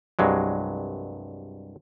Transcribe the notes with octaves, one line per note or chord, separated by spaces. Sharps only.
C2 G2 F#3 G#3